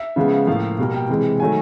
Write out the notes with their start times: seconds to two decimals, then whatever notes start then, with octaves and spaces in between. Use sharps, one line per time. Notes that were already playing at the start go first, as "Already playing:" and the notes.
Already playing: E5
0.16 C#3 F3 G#3 B3
0.47 A2 F3 A#3 F5
0.78 B2 G3 A#3
0.94 G5
1.09 C3 E3 G#3
1.40 D#3 F#3 A3 G#5